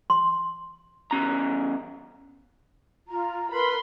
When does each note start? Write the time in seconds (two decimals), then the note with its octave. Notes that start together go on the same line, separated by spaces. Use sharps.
0.10 C6
1.11 E2 C#4 A#5
3.08 F4 A#5
3.51 A#4 B4 B5 C6